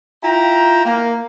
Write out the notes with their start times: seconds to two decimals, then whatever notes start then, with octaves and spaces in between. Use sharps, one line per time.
0.23 E4 F4 G5 A#5
0.85 A#3